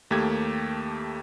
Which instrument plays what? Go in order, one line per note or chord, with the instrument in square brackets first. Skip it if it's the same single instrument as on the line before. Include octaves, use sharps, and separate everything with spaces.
[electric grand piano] D#2 A3 A#3 G4 G#6